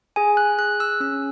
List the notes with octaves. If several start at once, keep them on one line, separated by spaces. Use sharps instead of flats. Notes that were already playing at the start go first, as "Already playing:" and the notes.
G#4 G#5
F#6
G#4 F#6
E6
C#4 E6